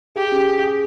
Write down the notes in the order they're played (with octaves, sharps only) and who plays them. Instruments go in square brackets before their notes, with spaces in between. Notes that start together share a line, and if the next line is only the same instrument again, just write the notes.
[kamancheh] G4 [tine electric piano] G#4
[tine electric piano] C#4
G#4
G#4